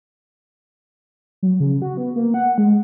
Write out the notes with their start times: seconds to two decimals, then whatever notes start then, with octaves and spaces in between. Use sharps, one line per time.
1.43 F#3
1.60 C#3
1.82 F#4
1.97 B3
2.16 A#3
2.34 F#5
2.58 G#3